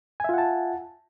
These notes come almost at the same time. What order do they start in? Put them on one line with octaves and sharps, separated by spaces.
G#5 E5 F4 F#5 A5